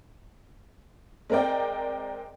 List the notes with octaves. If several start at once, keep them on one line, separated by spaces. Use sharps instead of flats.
G#3 C4 A#4 D5 G5